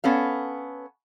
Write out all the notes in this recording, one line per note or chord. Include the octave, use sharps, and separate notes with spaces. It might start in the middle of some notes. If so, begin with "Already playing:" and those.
B3 C#4 A4 F5